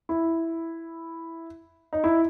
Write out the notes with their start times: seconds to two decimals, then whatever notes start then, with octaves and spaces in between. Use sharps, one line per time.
0.09 E4
1.93 D#4
2.04 E4